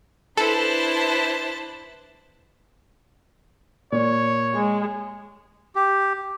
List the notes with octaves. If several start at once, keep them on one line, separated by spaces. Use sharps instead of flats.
D4 E4 A4 B4 C5 A5
A#2 C#5
G#3
G4